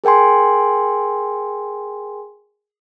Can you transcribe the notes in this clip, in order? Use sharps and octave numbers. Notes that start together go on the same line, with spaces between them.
G#4 A#4 G5 G#5 C6